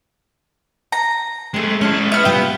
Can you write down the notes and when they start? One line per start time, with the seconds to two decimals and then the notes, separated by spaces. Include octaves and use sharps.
0.92 A#5
1.54 G#3 A3 C4 G#4
1.81 G#3 C#4 E4 A5
2.12 B3 E5 F6
2.25 C3 G3 F4 G5